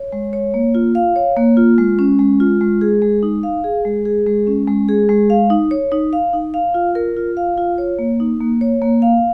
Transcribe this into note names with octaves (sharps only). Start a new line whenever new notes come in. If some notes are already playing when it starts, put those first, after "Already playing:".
Already playing: C#5
G#3
C#5
A#3
F4
F5
C#5
A#3
F4
G#3
C#4
G#3
F4
G#3
G#4
G#3
D#4
F5
G#4
G#3
G#4
G#3
C#4
G#3
G#4
G#3
F5
D#4
C#5
D#4
F5
D#4
F5
F4
A#4
F4
F5
F4
C#5
A#3
D#4
A#3
C#5
A#3
F5